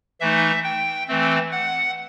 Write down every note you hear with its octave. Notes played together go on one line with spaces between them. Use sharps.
E3 A3 D#4 E5
G5
E3 A3 C4
F#5